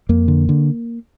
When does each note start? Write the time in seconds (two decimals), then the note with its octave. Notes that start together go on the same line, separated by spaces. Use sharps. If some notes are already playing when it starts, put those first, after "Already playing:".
0.09 F2 A#3
0.28 D3
0.49 D3